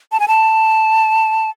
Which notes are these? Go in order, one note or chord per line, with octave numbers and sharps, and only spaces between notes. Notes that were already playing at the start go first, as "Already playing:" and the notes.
A5
G#5
A5